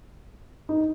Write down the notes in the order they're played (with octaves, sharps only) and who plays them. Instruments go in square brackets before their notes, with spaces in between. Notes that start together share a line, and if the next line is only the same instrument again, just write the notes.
[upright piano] D#4